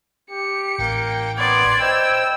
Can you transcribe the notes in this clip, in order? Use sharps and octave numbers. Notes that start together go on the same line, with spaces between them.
G4 C#7
A1 A2 A#3 G5
B3 D5 C6 G#6
C5 D#5 G5 B5 E6